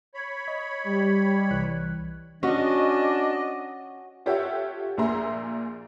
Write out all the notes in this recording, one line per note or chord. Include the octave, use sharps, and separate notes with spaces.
C#5 B5
D#5
G3
C2 E3 F#6
C#4 D4 F#4 D#5
F4 G4 A4 C#5 E5 F#5
A#1 A#2 G#4 E5 A#5 C6